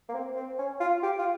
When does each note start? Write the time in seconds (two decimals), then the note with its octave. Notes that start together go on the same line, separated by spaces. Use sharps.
0.08 A#3
0.14 C4
0.36 C4
0.59 C#4
0.80 F4
1.03 G4
1.19 F4